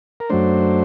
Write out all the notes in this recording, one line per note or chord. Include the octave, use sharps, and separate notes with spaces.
A#4
F#2 F#3 A3 D4 C5